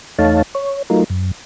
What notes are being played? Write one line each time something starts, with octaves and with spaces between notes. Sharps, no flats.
E2 A3 D#4 C#5 F5 A5
C#5
F#3 A3 D#4 F4 A#4
F#2